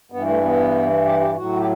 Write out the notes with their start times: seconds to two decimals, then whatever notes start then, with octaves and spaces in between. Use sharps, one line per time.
0.12 G2 E3 B3
0.27 A3
0.43 B3
1.05 G4
1.21 G4
1.36 A2 F#3 F#4
1.58 G4